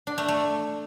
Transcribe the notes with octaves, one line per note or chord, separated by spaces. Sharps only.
D4
A3
A3